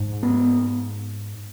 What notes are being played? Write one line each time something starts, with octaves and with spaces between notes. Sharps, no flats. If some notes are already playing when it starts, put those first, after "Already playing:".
Already playing: G#2
B3